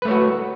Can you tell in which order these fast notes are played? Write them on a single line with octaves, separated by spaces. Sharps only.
B4 A3 C#5 F#4